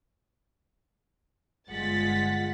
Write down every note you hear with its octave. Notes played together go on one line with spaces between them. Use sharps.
G1 G#3 F4 F#5 A6 B6